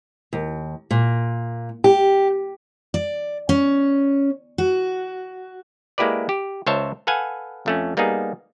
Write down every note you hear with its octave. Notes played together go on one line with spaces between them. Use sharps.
D#2
A#2
G4
D5
C#4
F#4
G#3 A#3 E4 G4 B4 D5
G4
C#2 C5 C#5 E5 A5
A4 B4 F5 F#5 G#5
F2 A3 C#4
G3 A#3 B3 D#4 G#4